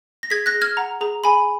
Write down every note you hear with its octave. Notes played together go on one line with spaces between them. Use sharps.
A#6
G#4 G#6 B6
F#6 A#6
G#4
F6 G#6
F#5 A#5
G#4 A#5
G#4 G#5 B5